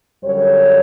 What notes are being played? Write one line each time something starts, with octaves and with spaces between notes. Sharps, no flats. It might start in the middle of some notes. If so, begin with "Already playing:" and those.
F#2 D3 G3 C#5